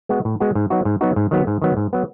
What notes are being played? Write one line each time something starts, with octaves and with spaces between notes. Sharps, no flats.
G#3 B3 F#4
A2
G#3 B3 F#4
G#2
F#3 B3 D#4 F#4
G#2
F#3 B3 D#4 F#4
G#2
D#3 F#3 B3
G#2
D#3 F#3 B3
G#2
F#3 B3